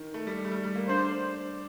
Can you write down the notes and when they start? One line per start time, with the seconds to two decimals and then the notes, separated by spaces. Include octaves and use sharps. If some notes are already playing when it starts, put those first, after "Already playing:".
Already playing: D#3
0.14 A3
0.27 G3
0.45 A3
0.52 G3
0.64 G3
0.76 A#3
0.88 D4 C5